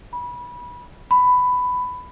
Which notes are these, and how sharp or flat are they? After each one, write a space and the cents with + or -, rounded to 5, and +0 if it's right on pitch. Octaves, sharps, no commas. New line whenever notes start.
B5 -20
B5 +10